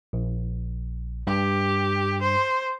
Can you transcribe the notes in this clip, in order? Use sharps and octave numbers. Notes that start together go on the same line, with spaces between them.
A#1
G2 G4
C5